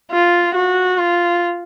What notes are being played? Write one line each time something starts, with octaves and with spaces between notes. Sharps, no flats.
F4
F#4
F4